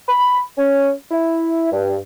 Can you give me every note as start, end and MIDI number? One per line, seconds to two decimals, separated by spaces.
0.09 0.41 83
0.57 0.91 61
1.11 1.68 64
1.72 1.96 43